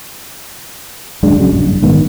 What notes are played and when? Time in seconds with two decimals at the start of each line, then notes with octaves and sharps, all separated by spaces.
1.23 D#1 F#2 G#3 D4
1.38 A#1 C#3 F#3
1.52 A#1 G2
1.65 F#1
1.82 A#1 G#2 D#3 B3